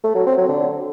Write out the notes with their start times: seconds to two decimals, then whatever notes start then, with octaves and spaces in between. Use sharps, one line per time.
0.04 A3
0.15 F#3
0.27 C4
0.38 F#3
0.49 D3